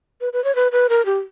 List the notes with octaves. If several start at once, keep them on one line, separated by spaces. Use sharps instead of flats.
B4
B4
C#5
B4
B4
A#4
G4